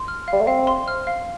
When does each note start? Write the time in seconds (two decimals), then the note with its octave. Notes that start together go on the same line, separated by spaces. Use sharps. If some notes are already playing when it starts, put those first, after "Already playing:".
Already playing: C6
0.08 F6
0.28 G3 F5
0.40 A3
0.47 C4 F5
0.67 C6
0.88 F6
1.07 F5